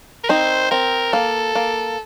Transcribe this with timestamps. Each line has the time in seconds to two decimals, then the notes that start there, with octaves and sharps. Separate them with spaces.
0.24 A#4
0.29 C4 D#4 C5
0.71 C4 A#4
1.13 A#3 A4
1.55 A#3